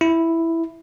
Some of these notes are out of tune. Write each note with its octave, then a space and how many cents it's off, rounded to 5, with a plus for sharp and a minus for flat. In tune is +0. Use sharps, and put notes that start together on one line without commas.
E4 +0